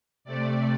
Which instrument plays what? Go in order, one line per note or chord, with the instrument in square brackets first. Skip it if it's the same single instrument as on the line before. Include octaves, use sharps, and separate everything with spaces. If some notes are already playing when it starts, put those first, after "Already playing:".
[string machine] C3 A3 D5